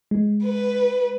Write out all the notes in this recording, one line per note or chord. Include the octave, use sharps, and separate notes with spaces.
G#3
B4